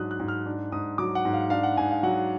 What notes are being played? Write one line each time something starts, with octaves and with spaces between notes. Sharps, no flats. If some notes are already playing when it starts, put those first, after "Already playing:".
Already playing: G#2 F#3 D4 D#6 F#6
F#6
G#2
F6
D4
G#2 D#6
F#3 D6
F#5
G#2
F5
D4 F5
F#5
G#2 G#5
F5
F#3 F#5